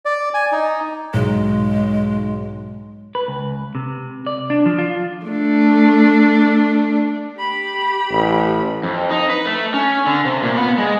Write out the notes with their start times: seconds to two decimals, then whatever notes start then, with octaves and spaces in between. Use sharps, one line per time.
0.05 D5
0.34 G#5
0.52 D#4
1.14 B1 G#2 G#3
3.15 B4
3.28 C#2
3.75 C3
4.27 D5
4.50 D4
4.66 F3
4.79 F4
5.26 A3 D4
7.37 G4 B5
8.11 A1
8.83 F2
9.11 D#4
9.30 B4
9.45 A3
9.74 C#4
10.06 D3
10.25 C3
10.43 A#2
10.57 B3
10.78 G#3